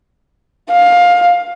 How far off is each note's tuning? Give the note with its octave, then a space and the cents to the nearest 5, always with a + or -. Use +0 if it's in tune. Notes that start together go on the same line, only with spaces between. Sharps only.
F5 +20